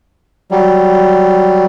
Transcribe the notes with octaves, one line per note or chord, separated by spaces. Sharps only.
F#3 G3